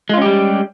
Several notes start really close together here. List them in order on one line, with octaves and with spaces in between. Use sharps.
G#3 F4 C#4 G4 G3